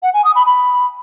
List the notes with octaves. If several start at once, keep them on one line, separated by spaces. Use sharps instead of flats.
F#5
G#5
D#6
B5
B5